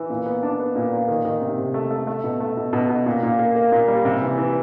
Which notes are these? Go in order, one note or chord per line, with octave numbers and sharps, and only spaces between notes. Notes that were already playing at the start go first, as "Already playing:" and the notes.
Already playing: E3
A#2
B3
D4
B3
A#2
A#2
D#3
D#3
C3
C3
A3
A3
A3
B2
A3
B2
B2
B2
A#2
A#2
A#3
A#3
A#2
G3
C3
E3
E3